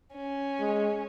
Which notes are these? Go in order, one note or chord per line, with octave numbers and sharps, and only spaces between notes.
C#4
G#3